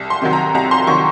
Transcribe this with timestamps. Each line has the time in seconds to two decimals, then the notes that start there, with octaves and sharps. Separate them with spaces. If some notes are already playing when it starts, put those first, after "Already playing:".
Already playing: C2
0.10 C6
0.22 C3 D#3 F#3
0.33 A#5
0.54 C2 A#5
0.71 C6
0.87 C3 D#3 F#3 C#6